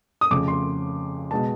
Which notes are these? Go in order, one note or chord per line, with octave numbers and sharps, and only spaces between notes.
D#6
F2 C#3 F3 A3 D6
C6
B2 G#3 B3 A5